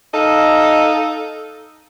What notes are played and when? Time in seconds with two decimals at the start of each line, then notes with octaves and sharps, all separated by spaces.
0.14 D#4 A4 D#5 F5